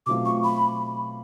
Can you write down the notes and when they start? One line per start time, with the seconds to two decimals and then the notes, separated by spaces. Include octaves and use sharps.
0.06 B2 F#3 A3 C4 F4 D6
0.25 C#6
0.44 B5